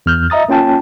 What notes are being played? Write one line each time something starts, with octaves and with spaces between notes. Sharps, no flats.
E2 F6 G6
D#5 E5 A#5 D#6 A6
A#3 C#4 F4 G5 A5